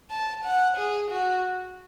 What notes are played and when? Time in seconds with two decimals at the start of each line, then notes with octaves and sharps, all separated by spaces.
0.10 A5
0.44 F#5
0.77 G#4
1.11 F#4